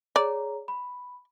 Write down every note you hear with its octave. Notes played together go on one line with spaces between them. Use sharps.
G#4 C#5 D5 A#5
B5